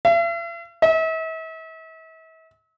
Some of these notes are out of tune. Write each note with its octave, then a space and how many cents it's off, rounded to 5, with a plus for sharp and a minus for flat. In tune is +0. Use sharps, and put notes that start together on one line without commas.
E5 +45
E5 -40